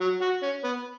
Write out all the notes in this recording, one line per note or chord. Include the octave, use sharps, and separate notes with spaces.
F#3
F#4
C#4
B3